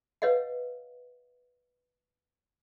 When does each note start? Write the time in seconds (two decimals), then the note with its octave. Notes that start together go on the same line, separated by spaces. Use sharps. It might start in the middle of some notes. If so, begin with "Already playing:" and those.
0.22 B4 C#5 D#5 F5 F#5